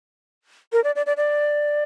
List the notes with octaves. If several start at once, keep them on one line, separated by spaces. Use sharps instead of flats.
A#4
D5
D5
D5
D5